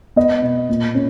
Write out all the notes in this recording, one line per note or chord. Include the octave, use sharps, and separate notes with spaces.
B3 D#5
B2
A#2
C#4